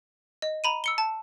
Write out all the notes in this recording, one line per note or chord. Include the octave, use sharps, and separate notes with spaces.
D#5
A#5 B5 D#7
E6 C#7 G7
A5